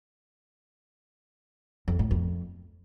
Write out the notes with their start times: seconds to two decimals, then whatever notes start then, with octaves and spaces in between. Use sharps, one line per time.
1.88 F2
1.99 A2
2.11 F2